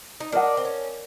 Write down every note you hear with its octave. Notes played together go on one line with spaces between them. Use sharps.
D#4
D4 A#4 D#5 F#5
C4
C#4